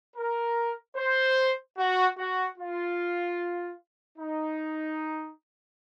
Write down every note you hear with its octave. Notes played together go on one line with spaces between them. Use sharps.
A#4
C5
F#4
F#4
F4
D#4